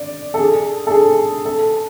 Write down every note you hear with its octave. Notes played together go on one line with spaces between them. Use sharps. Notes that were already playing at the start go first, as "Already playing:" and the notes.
Already playing: D5
A4
G#4
A4
G#4
A4